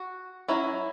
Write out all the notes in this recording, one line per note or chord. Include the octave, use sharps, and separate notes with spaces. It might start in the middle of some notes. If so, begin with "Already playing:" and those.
Already playing: F#4
F#3 C#4 E4